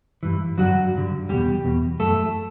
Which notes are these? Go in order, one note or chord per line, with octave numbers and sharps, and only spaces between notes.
G2 E3
G2 D3 F#3 F#4
G2 D3
E2 B2 G3 G4
E2 B2
F#2 E3 A3 A4